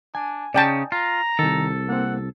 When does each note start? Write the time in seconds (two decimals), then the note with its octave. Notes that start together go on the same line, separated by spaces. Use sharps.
0.15 D4 G#5
0.54 C#3 C#4 D#4 D5 G5 A5
0.92 F4 A#5
1.39 C2 D#3 A4
1.89 A#3 C4 F#5